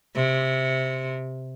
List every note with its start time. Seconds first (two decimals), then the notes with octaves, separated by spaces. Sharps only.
0.15 C3